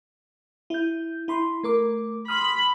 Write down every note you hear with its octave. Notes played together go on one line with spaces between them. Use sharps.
E4 G6
E4 B5 C6
A3 A#4 D6
B5 C6 D#6 F6